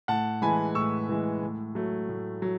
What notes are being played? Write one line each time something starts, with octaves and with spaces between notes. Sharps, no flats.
A2 F#5 A5
E3 G#3 G#5 B5
A2 C#6 E6
E3 G#3
A2
F#3 A3
A2
F#3